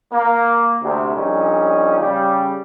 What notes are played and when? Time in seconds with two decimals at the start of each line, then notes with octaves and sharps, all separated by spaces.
0.12 A#3
0.82 D2 C3
1.15 A#1 A#2 G3 C#4 D#4
2.00 C#3 G3